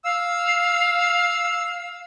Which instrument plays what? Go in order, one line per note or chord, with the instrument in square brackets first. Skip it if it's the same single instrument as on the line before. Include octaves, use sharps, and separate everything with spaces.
[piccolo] F5 [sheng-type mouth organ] E6